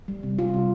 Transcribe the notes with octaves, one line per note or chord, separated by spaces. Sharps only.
G3
C3
G3 F4
C3